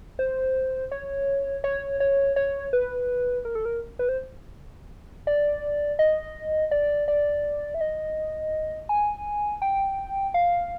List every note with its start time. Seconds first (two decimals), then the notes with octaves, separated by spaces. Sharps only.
0.19 C5
0.92 C#5
1.64 C#5
2.00 C#5
2.36 C#5
2.73 B4
3.45 A#4
3.55 A4
3.65 A#4
3.99 B4
4.09 C5
5.27 D5
5.99 D#5
6.71 D5
7.08 D5
7.74 E5
7.81 D#5
8.89 G#5
9.62 G5
10.34 F5